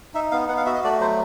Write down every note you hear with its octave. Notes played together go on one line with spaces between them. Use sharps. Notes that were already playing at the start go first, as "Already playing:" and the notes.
D#4 E5
B3 F5
B3 F#5
F5
F#4 E5
D#5
A3 D5
F#3 C5